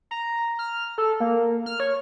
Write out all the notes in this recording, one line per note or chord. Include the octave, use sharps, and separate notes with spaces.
A#5
F6
A4
A#3
F6
C#5